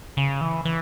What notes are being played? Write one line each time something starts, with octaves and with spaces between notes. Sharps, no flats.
C#3
E3
E3